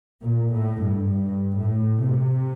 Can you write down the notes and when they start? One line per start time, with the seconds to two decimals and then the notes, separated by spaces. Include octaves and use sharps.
0.21 A#2
0.50 A2
0.80 G2
1.10 G2
1.56 A2
2.01 C3